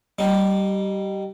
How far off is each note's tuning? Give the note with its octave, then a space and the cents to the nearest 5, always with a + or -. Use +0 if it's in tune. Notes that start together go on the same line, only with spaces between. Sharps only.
G3 -20 D#4 -25